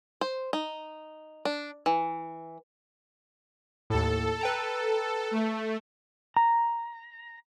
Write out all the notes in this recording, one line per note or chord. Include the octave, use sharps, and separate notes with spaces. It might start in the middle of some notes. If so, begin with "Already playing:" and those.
C5
D#4
D4
E3
D#2 A2 A4
B4 G5 A#5
A3
A#5